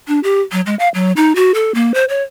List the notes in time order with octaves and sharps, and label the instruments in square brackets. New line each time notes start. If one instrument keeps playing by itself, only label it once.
[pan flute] D4
G4
F#3
G#3
F5
F#3
D#4
F#4
A4
A#3
C5
C#5